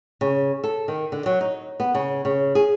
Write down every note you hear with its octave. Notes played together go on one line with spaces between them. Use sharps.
C#3
A4
D#3
D3
F#3
D#4
B3
C#3
C#3
G#4